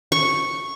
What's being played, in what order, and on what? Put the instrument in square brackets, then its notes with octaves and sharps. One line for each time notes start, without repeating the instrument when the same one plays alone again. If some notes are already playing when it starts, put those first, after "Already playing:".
[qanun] C#6